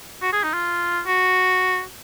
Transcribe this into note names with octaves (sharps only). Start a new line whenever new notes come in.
F#4
G#4
D#4
F4
F#4